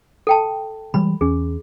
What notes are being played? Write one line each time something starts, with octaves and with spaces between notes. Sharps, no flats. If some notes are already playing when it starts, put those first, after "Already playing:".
A4 G5 A5
E3 G3 G#3 B5
E2 C#4 G#4